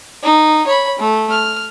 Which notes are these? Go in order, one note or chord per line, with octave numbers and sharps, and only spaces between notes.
D#4
C#5 B5
A3
F6